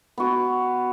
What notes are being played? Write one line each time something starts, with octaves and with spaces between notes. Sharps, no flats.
B3 F#4